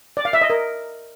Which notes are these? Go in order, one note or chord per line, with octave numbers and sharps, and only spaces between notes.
D5
F5
E5
D#5
A#4